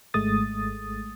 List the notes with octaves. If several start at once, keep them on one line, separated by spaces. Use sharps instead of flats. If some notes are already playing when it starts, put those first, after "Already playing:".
G#1 G#3 A3 D#6 A6